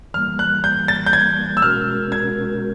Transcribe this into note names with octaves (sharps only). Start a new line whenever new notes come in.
E3 G3 A#3 F6
F#6
G6
A6
G6
G#6
E6
B2 G#3 C#4 F#4 A#4 F6
G#6